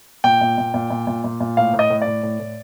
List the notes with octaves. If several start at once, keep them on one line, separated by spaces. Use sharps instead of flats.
A#2 G5
A#2
A#2
A#2
A#2
A#2
A#2
A#2
A2 F5
A2
D#5
A2
A2 D5
A2
A2